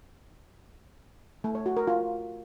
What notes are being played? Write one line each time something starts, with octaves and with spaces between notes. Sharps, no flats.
A3
C#5
F#4
A#4
F4